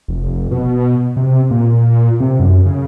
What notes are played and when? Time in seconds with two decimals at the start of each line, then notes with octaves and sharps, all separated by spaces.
0.08 F1
0.51 B2
1.17 C3
1.51 A#2
2.20 C3
2.39 F#2
2.66 C#3